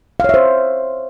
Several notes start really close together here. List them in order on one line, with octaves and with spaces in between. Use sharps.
F5 C#5 E5 C5